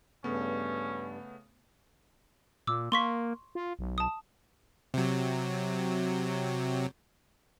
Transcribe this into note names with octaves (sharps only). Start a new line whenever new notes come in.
G2 C#3 A3 B3 C#4
A#2 D6 E6
A#3 C6 C#6 B6
F4
B1
A5 D#6
C3 F#3